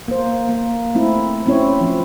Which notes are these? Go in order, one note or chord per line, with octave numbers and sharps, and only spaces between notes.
A#3 C5
A#3
A3 C4 E4
F#3 C4 C#4 E4 C#5
F3 C4